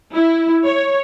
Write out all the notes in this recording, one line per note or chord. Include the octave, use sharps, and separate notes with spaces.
E4
C#5